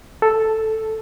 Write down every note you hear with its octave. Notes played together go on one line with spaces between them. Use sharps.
A4